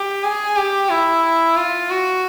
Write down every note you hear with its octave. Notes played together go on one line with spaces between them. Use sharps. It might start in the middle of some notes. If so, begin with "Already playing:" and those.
Already playing: G4
G#4
G4
E4
F4
F#4